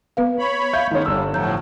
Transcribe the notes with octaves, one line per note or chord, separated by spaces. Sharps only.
B3 B4 F5
C#5 B5
E5 F5 G6
D#3 G#3 B3 C#4
G1 G3 E6
A2 F3 F#3 A#5 G6